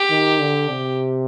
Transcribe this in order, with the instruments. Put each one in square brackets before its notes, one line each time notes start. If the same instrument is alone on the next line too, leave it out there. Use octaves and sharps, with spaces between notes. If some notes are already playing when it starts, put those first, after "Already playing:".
Already playing: [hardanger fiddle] G4
[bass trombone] D#3
D3
C3